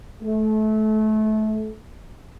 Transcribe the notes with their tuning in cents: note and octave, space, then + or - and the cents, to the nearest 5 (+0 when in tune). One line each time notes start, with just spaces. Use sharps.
A3 -25